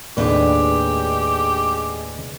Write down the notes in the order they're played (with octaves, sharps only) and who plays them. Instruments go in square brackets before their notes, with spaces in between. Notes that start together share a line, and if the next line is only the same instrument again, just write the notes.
[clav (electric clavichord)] D#2 A2 [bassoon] G#3 [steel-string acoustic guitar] D4 B4 [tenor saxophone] G4